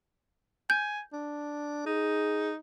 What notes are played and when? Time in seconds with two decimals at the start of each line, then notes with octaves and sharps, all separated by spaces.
0.70 G#5 G6
1.13 D4
1.86 D#4 G#4